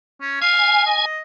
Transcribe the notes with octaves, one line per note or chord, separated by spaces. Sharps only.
C#4
F5 G#5
D#5